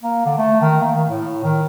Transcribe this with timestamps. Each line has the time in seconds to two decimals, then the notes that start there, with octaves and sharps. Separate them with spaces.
0.03 A#3
0.26 D3
0.38 A3
0.61 D#3
0.81 A#3
0.95 D#3
1.09 A2
1.44 D#3